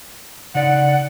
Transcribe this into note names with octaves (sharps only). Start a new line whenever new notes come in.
C#3 D#4 D5 F#5